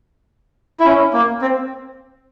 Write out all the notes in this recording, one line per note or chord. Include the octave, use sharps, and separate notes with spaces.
E4
C#4
A#3
C4